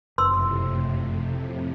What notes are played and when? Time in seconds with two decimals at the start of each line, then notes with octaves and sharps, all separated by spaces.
0.18 F#1 F2 A2 C3 C6 E6